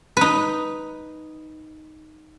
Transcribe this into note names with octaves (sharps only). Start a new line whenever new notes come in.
D#4 B4